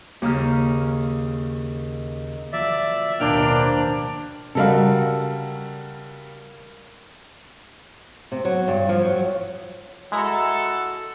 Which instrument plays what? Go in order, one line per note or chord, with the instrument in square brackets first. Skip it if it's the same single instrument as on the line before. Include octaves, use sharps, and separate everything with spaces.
[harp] D#2 C#3 D#4 F6
[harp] F3 F#3 A#3 [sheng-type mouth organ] D5 E5
[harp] A1 D#2 B2 [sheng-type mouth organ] A#3 G5 F6 [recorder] D4
[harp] B4 C5 A#5
[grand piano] C#3 G3 F#4 [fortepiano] A4 A#4 F5
[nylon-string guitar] C3
F#3
G2
F3
F#3
[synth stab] G#3 E4 A#5 [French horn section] F#4 A4